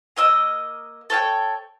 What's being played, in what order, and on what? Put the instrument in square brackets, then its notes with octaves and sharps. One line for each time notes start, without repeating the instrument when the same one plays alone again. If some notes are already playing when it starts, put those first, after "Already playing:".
[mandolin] A#3 D#5 E6
A4 C#5 F5 G5